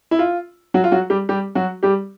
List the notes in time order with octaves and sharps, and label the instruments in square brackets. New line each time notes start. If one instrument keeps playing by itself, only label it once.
[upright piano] E4
F4
F#3 F#4
F4
F#3 F#4
G3 G4
G3 G4
F#3 F#4
G3 G4